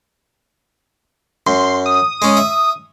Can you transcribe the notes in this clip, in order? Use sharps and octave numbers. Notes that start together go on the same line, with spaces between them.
F#2 C6
D#6
G#3 C#4
E5